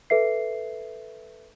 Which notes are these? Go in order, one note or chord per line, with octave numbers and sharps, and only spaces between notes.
A4 B4 E5 C7